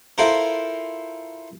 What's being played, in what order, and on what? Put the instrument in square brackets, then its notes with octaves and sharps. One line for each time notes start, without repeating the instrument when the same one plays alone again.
[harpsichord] E4 F4 A4 A#4 C5